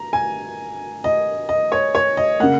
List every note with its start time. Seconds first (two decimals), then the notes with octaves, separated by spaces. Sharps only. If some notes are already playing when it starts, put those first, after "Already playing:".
Already playing: A#5
0.13 G#5
1.04 D#5
1.49 D#5
1.72 C#5
1.95 C#5
2.17 D#5
2.40 C#3 A#3 F#5